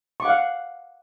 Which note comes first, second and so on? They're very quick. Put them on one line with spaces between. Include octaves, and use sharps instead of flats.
C#6 D6 F#5 F5